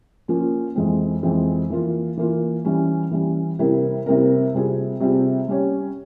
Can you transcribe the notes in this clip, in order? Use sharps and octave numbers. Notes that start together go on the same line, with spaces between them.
F3 A#3 C#4 F4
F2 E3 G#3 C4
F2 E3 G#3 C4
E3 A#3 F4
E3 A#3 F4
E3 G3 C#4
E3 G3 C#4
C3 G3 C4 E4 A#4
C3 G3 C4 E4 A#4
C3 G3 C4 F4 G#4
C3 G3 C4 F4 G#4
G3 C#4 G4 C#5